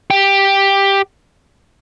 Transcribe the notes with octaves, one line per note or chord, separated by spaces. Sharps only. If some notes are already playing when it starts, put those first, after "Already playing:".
G4